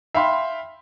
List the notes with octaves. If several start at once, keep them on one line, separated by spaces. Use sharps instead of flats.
E5 F5 G5 B5 C6